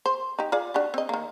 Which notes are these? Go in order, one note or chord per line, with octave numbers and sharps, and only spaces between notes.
C5
D#4 G4
F4 G#4 D5
D4 F#4 G4
C4 D#5
D#3 A#3